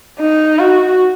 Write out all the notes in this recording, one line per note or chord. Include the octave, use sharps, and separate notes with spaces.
D#4
F#4